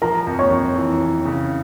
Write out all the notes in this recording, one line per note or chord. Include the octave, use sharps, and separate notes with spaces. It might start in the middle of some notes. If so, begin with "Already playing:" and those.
F3 A#4 A#5
F2
C#5 C#6
F2
E3
F2
C#3